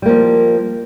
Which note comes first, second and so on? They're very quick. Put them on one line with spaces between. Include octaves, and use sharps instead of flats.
G3 A#3 F3